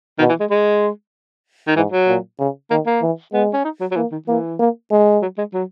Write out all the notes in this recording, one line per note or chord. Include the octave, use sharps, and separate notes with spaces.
B2 D#3
E3
G#3
G#3
D#3
G#2 E3
F#3
A#2
C#3
D#3 A#3
A#3
E3
G#3 B3
C#4
D#4
F#3
F#3
E3 A#3
D#3
E3 A#3
A#3
G#3
F#3
G#3
F#3